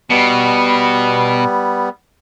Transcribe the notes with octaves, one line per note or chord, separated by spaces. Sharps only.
B2 G3 B3